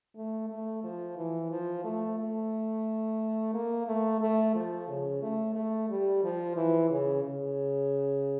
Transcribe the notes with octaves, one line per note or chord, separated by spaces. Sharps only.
A3
A3
F3
E3
F3
A3
A3
A#3
A3
A3
F3
C#3
A3
A3
G3
F3
E3
C#3
C#3